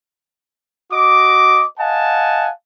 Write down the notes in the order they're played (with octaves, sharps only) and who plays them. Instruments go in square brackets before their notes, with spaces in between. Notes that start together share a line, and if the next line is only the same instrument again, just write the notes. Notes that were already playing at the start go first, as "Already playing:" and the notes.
[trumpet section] F#4 D#5 D6
D#5 F5 F#5 G#5 A5